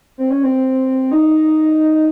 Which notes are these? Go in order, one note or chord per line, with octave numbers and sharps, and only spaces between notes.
C4
C#4
C4
D#4